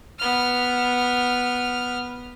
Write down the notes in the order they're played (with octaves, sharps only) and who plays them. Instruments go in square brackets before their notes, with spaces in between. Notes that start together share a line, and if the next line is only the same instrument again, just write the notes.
[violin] B3 F6